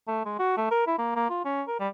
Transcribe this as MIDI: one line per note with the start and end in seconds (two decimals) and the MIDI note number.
0.08 0.22 57
0.25 0.39 56
0.39 0.55 66
0.57 0.67 57
0.71 0.85 70
0.87 0.95 64
0.98 1.15 58
1.16 1.29 58
1.30 1.43 65
1.45 1.62 61
1.68 1.78 70
1.80 1.88 55